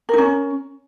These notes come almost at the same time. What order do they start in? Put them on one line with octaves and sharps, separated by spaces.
A#4 D#4 C#4